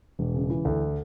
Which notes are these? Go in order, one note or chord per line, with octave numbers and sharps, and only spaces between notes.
E1
C#3
E3
D2